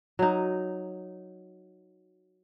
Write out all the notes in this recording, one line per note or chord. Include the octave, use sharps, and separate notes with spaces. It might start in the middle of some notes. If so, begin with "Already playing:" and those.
F#3 D#4